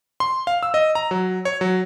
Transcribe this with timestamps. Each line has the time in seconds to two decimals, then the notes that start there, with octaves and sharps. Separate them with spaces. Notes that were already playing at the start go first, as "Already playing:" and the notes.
0.20 C6
0.47 F5
0.63 E6
0.74 D#5
0.95 A#5
1.11 F#3
1.45 C#5
1.61 F#3